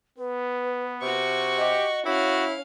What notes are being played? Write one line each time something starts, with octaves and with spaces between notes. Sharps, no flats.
B3 B4
C3 F#4 C#6
G4 D#5
C#4 E4 F#4 C#5 F5